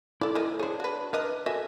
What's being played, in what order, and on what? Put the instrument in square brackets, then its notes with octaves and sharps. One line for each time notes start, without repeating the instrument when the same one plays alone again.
[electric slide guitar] E4 [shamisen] A4 D5
[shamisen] F3 A#3 D#5
[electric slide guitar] D4 C#5 [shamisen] G#4 C5
[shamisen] F#4 B4
[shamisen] D4 B4 D#5 [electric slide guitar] A#4
[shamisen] F#4 D#5 E5 [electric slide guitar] A4 G#5